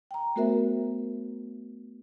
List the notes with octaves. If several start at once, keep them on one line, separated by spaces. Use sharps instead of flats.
G5 A#5
A3 B3 F#4 A#4 C5 E5